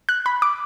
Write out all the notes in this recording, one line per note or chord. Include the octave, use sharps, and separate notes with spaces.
F#6
B5
D6